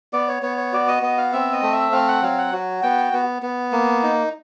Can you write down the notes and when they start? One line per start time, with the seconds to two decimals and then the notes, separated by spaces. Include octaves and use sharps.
0.13 B3 D5
0.28 C#5
0.42 B3 C#5
0.57 C#5
0.73 F#4 D5
0.88 D#5
1.02 B3 D#5
1.18 F5
1.33 C4 E5
1.53 D#5
1.62 A3
1.72 E5
1.92 C4 F5
2.08 F#5
2.22 F#3 F5
2.38 F#5
2.52 F#4
2.83 B3 G5
3.13 B3
3.42 B3
3.72 A#3
4.03 D#4